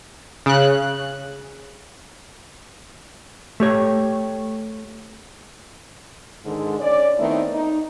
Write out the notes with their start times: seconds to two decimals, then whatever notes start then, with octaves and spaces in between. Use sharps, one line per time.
0.46 C#3 F#6
3.60 A3 G4 C#5
6.45 G#2 D3 D#3 G#3
6.80 C#4 D5
7.18 D#3 A3 B3 C4 D#4 E4
7.54 D#4